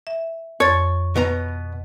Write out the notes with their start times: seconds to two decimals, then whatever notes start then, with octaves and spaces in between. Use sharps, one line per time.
0.07 E5
0.60 F2 C#5 C6 A6
1.16 B2 B3 A#5